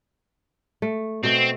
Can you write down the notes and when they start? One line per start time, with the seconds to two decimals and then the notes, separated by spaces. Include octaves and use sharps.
0.82 A3
1.24 B2 A3 C4